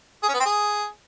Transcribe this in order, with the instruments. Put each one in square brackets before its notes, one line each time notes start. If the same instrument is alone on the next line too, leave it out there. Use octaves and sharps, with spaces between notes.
[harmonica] G#4
C#4
B3
C4
G#4